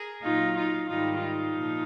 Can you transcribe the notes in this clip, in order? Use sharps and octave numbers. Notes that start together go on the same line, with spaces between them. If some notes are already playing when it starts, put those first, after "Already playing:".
Already playing: G#4 A#4
A#2 F#3 D#4 F4
D#4 F4
G#2 D#3 G3 D#4 F4
D#4 F4
A#2 F3